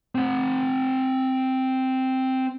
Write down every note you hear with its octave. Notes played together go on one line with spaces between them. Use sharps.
C4 F#5